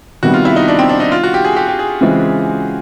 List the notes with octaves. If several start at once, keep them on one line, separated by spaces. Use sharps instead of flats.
C3 D#3 G3 B3 F#4
F4
E4
D#4
D4
C4
D4
D#4
F4
F#4
G4
G#4
G4
G4
G#4
C#3 E3 G#3 C4 F4